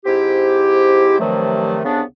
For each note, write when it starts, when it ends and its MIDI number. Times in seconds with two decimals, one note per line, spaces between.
0.05 1.17 44
0.05 1.17 60
0.05 1.17 64
0.05 1.17 67
1.19 1.80 43
1.19 1.80 48
1.19 1.80 51
1.19 1.80 53
1.19 1.80 54
1.19 1.80 57
1.84 2.02 36
1.84 2.02 49
1.84 2.02 59
1.84 2.02 62